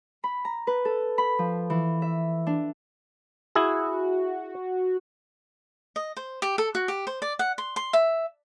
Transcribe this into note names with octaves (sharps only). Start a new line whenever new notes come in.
B5
A#5
B4
A4
B5
F3
E3
E5
D4
E4 F#4 G#4
D#5
C5
G4
A4
F#4
G4
C5
D5
F#5
C6
C6
E5